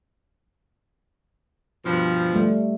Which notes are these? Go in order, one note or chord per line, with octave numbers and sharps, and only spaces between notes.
G2 B2 F3
G3 A3